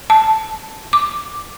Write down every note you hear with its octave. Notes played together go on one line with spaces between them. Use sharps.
A5
D6